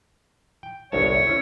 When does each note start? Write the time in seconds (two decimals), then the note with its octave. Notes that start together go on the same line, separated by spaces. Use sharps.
0.63 G5
0.92 G1 C2 C#5 A5
1.05 C#5
1.27 C#4 E4